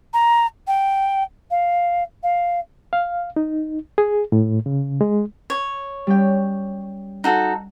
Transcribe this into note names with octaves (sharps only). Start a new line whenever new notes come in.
A#5
G5
F5
F5
F5
D#4
G#4
A2
C#3
G#3
C#5
G3 C#4 G5
D#4 F#4 A4